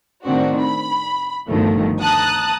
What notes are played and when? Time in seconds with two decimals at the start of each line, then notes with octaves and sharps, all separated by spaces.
0.24 A2 D#3 C4 D4 F#4
0.61 B5
1.48 G1 D2 D#3 F3 A3
2.02 A5 A#5 D#6 F#6